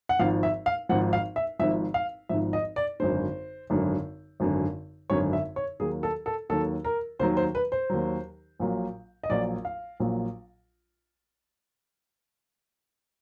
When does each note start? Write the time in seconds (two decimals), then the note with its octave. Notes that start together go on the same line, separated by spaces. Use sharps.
0.09 F#5
0.19 G#1 G#2 F3 F5
0.43 E5
0.66 F5
0.89 G#1 G#2 F3 F#5
1.13 F5
1.36 E5
1.59 G#1 G#2 F3 E5
1.94 F5
2.29 G#1 G#2 F3 E5
2.53 D#5
2.76 D5
3.00 G#1 F#2 D3 C5
3.70 G#1 F#2 D3
4.40 G#1 F#2 D3
5.10 G#1 F#2 D3 C#5
5.33 E5
5.56 C#5
5.80 D#2 D#3 F#3 G#4
6.03 A4
6.26 A4
6.50 D#2 D#3 F#3 A4
6.85 A#4
7.19 D#2 D#3 F#3 C5
7.37 C5
7.55 B4
7.72 C5
7.90 D#2 D#3 F#3
8.59 A#1 A#2 F#3
9.23 D#5
9.29 A#1 A#2 F#3 D5
9.65 F5
10.00 A#1 A#2 F#3